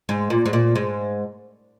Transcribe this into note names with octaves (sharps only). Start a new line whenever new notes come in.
G#2
A#2
G#2
A#2
G#2